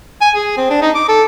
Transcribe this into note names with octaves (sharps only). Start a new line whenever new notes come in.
G#5
G#4
C4
D4
D#4
D6
A4